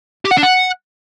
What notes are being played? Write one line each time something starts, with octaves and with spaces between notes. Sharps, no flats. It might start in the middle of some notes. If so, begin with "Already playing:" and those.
G4
F#5
D4
F#5